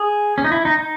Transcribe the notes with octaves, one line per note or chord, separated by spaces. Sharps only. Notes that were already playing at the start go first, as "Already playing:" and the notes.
Already playing: G#4
C#4
D#4
E4
D#4
D#4